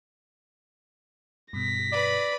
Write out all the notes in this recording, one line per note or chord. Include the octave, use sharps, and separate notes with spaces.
G2 B2 A#6 B6
B4 D5 B5